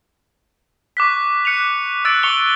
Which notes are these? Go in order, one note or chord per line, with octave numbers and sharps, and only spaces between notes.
C#6 D6 F#6 B6
F#6 C#7 D#7 F7
D6 E6 F#6 A6 D7
C#6 D6 C#7 F7 G7